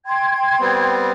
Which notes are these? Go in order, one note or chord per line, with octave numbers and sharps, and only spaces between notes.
G5 C6 G#6
G3 B3 C4